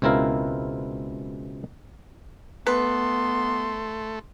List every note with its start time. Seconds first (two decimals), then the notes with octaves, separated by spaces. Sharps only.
0.02 C#2 B2 C4 E4 A#4 F5
2.67 A3 B3 B4 C6